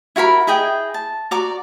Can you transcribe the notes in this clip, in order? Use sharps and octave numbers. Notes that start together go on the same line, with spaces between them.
E4 F#4 A#4 B5
E4 G#4 D#5 G5
A5
F#4 D5 A#5 D6